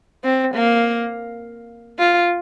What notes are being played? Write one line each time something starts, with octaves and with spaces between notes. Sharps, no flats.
C4
A#3
F4